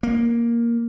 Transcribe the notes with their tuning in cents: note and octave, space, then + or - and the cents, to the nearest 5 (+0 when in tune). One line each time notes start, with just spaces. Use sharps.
A#3 +5